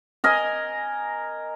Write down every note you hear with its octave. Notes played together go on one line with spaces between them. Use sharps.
A#4 D#5 G#5